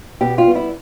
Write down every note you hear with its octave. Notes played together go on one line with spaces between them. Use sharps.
B2 G4
F4
G3 B3
E4